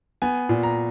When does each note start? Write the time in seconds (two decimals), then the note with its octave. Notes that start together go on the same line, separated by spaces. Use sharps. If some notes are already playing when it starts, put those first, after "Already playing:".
0.22 B3 G#5
0.49 A#2
0.63 A#5